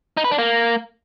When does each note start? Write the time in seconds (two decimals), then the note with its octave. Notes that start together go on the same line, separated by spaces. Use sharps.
0.17 D#4
0.24 B4
0.31 D4
0.39 A#3